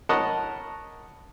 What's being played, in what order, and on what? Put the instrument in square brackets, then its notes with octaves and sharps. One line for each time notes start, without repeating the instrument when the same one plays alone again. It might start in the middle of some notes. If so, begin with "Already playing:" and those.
[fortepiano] A#4 C#5 D#5 F#5 A5 B5